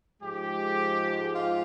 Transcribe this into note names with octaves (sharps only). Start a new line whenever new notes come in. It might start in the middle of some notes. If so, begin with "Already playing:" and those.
G#2 F3 G#3 G4
F4